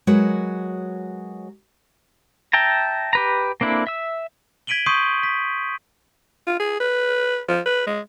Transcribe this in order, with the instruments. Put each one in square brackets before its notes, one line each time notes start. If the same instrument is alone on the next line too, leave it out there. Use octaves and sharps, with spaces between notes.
[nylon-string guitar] F#3 G#3 F#4 A#4 B4
[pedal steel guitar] E5 G5 A5 A#5
G4 B4 A#5
A#3 C4 D4 E4 A4
E5 E6
[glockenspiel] G#6 B6 D7 D#7 F#7 G7
C6 C#6 D#6 G6 C7 D#7
B6
[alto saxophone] F4
G#4
B4
F3
B4
G#3